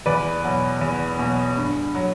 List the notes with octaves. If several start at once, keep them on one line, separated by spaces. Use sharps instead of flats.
E2 B4 D5
B2 F#3
E2
B2 F#3
G2
F#3